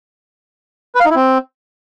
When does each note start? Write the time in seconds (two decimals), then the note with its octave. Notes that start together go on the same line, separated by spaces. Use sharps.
0.95 B4
1.00 F5
1.05 D#4
1.10 E4
1.15 C4